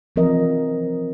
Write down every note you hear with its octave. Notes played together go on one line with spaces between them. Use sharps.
E3 F3 C4 A#4 D#5